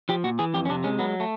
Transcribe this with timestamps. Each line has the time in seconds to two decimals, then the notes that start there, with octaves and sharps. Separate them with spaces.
0.09 F3 G4
0.24 A#2 F#4
0.39 E3 G#4
0.54 F2 G4
0.65 C#4
0.69 C3 D4
0.84 G#3 C#4
0.99 F#3 B3
1.20 A3